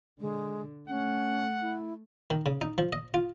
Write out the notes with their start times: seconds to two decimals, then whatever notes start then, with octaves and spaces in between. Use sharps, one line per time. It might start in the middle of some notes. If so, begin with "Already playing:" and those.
0.20 D3 G#3
0.89 A3 C#4 F#5
1.61 E4
2.30 D#3
2.46 C#3
2.61 D#4
2.78 F3
2.93 D#5
3.14 F4